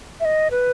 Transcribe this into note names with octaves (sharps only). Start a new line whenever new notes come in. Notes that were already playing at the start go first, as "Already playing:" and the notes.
E5
D#5
B4